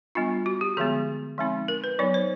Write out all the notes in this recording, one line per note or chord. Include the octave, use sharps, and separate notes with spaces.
G3 B3 D4 F4
F#4
G4
D3 F3 G#3 B3 G#4
F3 G#3 C4 D#4
A#4
B4
F#3 B3 D#4 C#5
C5